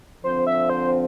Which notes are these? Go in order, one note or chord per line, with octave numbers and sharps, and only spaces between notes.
D3 F3 C4 C5
E5
C5